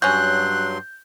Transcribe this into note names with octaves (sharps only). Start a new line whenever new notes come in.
G2 F#3 C#4 F#4 C6 F#6 G6